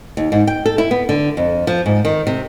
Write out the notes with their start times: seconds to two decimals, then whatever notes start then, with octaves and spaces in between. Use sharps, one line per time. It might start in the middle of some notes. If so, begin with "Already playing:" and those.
0.17 D#2
0.32 G#2
0.47 G5
0.66 A4
0.78 E4
0.91 B3
1.09 D3
1.37 F2
1.67 F3
1.86 G#2
2.05 D#3
2.27 C3